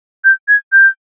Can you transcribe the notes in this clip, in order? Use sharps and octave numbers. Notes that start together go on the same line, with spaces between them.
G6
G#6
G6